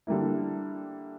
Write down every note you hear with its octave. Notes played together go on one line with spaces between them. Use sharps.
D3 G3 A#3 E4